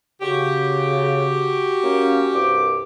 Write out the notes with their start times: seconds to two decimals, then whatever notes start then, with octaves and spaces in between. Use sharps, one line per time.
0.21 C#3 F#4 G4
1.83 A#3 C#4
2.34 C2 G2 D6